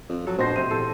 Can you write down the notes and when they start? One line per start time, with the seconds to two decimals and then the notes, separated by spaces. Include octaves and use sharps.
0.10 F2
0.27 F#3 A4
0.38 A#1 B2 C5 A#6 C7
0.56 C3 D#7
0.71 E2 G4 A4